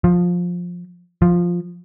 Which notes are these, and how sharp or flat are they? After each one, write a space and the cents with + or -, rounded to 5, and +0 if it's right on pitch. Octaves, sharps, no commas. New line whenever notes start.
F3 +15
F3 +5